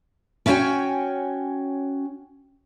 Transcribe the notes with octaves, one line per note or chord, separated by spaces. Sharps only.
C#4 E4 F#4 C#5 G5 G#5